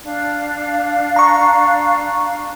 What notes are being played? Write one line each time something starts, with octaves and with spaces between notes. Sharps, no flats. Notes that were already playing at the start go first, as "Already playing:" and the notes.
D4 F5
A#5 C#6